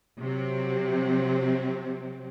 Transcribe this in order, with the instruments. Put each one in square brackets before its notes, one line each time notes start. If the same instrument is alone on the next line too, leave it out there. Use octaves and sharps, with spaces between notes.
[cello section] C3 F#3 C4